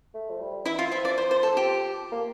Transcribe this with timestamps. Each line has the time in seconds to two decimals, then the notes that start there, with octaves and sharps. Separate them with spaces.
0.14 A3
0.30 F3
0.40 G3
0.66 E3 E4 E5
0.79 F4 F5
0.92 F3 E4 E5
1.05 D5
1.18 C5
1.31 C5
1.43 A4
1.57 G4
2.12 A#3